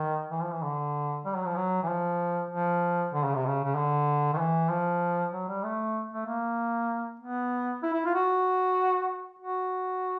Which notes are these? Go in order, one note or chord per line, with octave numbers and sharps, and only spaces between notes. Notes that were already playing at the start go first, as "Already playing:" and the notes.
Already playing: D#3
E3
F3
E3
D3
G3
F#3
F3
F#3
E3
F3
F3
D3
C#3
C3
C#3
C#3
D3
D#3
E3
F3
F#3
G3
A3
A3
A#3
B3
E4
E4
F4
F#4
F#4